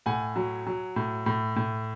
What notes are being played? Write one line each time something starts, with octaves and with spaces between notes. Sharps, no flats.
A2 F#5 G#5
F#3
F#3
A2
A2
A2